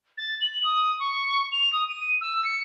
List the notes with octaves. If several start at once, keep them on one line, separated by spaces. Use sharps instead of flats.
A6
F#7
D#6
C#6
F7
D#6
D#7
E6
C#7